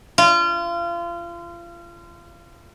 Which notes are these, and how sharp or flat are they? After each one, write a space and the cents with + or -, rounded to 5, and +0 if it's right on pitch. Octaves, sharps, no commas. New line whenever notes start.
F4 -30